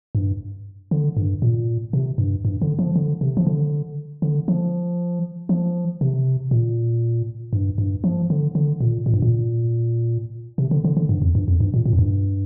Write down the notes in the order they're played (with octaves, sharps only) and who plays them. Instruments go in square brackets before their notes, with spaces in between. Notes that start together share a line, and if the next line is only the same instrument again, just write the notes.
[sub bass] G2
D3
G2
A#2
C3
G2
G2
D3
F3
D3
C3
F3
D3
D3
F3
F3
C3
A#2
G2
G2
F3
D3
D3
A#2
A#2
G2
A#2
C3
D3
D3
D3
G2
F2
G2
F2
G2
A#2
A#2
F2
G2